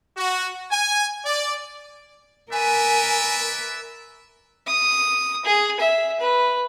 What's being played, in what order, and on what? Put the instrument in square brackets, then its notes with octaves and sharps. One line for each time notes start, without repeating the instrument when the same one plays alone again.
[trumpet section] F#4
G#5
D5
[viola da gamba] A#4 [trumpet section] B4 D5 E5 [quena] G#5
[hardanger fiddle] D#6
G#4
E5
B4